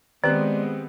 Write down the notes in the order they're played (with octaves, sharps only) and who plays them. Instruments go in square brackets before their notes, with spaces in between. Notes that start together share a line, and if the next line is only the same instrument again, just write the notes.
[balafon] D#3 [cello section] G#3 B3 [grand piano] C4 G4 F#6 [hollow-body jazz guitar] D5